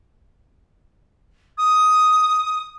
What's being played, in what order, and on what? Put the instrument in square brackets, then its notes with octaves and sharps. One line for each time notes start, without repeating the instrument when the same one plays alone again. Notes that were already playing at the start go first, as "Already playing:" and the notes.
[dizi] D#6